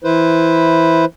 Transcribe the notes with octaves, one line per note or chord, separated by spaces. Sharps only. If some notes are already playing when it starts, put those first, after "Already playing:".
E3 E4 B4 C5